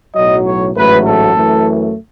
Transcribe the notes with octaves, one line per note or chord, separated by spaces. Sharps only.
B1 A2 F#3 D#5
C#5
A1 G#2 F#3 A3 B4
A4
F#2 E3 A3